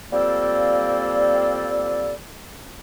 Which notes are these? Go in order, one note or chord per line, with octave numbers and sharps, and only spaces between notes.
F3 G3 A#3 C4 A4 D5